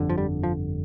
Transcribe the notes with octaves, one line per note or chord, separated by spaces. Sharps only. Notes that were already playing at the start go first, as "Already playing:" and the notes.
Already playing: G1 F2 D3
F3
G3
F3